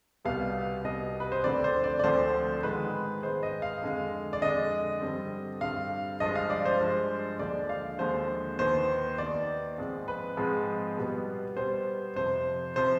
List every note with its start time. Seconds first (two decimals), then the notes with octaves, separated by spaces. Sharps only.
0.25 C2 B2 G3 B3 F5
0.84 C2 B2 G3 B3 D#5
1.20 B4
1.32 C5
1.44 D2 D3 F3 C4 D5
1.64 C5
1.84 D5
1.99 D5
2.04 D2 D3 F3 C4 C5
2.63 G#2 D#3 G#3 B3 B4
3.23 G#2 D#3 G#3 B3 C5
3.43 D#5
3.62 F5
3.82 F2 D3 G#3
4.33 D5
4.41 F2 D3 G#3 D#5
5.01 G2 D3 G3 C4
5.61 G2 D3 G3 C4 F5
6.20 G2 F3 G#3 D#5
6.35 F5
6.50 D5
6.65 C5
6.80 G2 F3 G#3
7.39 D#2 D3 F3 G#3 D5
7.69 F5
7.99 D#2 D3 F3 G#3 C5
8.59 D#2 D#3 B3 C5
9.18 D#2 D#3 B3 D5
9.78 G#2 F3 G#3 C4
10.08 B4
10.37 G#2 F3 G#3 C4
10.97 B2 G3 B3
11.56 B2 G3 B3 C5
12.16 F2 C3 F3 C5
12.76 C3 F3 C5